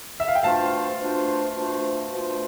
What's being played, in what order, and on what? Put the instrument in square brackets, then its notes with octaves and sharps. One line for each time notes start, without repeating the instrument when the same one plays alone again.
[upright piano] E5
F5
G5
[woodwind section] B2 A3 D4 F4 C5 [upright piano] F5 A5
[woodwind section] B2 A3 D4 F4 C5
B2 A3 D4 F4 C5
B2 A3 D4 F4 C5